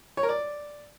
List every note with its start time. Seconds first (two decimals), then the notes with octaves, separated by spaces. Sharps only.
0.17 C#5
0.23 A#4
0.29 D5